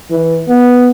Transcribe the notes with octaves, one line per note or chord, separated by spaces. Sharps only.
E3
B3